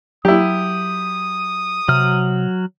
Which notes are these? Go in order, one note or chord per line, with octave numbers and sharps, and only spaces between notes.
F#3 E4 G4 D#6
C3 F#3 F6